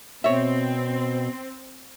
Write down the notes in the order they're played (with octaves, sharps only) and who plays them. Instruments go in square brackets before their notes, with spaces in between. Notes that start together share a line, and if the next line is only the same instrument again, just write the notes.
[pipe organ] B2 [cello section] C4 [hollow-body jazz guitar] C#5 E5